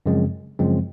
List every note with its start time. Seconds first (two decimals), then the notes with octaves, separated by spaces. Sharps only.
0.06 F#2 C#3 F3 G#3 C4
0.59 F#2 C#3 F3 G#3 C4